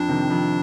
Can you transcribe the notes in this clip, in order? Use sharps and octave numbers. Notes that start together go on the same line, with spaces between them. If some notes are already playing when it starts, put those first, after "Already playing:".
Already playing: F2 D4
C3 D#3
F2